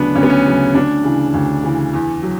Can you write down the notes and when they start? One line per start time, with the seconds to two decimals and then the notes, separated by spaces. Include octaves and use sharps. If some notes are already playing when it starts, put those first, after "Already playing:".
Already playing: D2 C#3 F#3 B3 D4
0.15 D2 C#4
0.23 B3
0.30 C#4
0.45 C#3 F#3
0.75 D2 D4
1.04 C#3 E3
1.34 D2
1.63 C#3 E3
1.93 E2
2.22 F#3